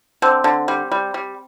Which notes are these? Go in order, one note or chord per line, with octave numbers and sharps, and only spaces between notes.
D3 C4
D3
G3
G3
G3